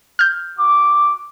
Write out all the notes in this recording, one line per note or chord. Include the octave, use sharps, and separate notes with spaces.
F6 G6
F#4 D6